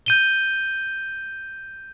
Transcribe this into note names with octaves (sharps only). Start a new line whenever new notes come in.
G6 D#7 G7